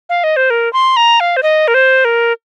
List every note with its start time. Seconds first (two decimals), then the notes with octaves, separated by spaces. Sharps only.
0.09 F5
0.24 D#5
0.36 C5
0.50 A#4
0.73 C6
0.97 A#5
1.20 F5
1.37 C5
1.43 D#5
1.68 A#4
1.74 C5
2.05 A#4